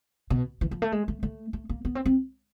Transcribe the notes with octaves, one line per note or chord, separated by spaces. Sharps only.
B2
E3
F3
A3
G#3
A3
A3
A3
A#3
B3
C4
C4